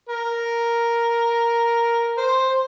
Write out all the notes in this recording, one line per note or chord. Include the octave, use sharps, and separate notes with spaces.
A#4
C5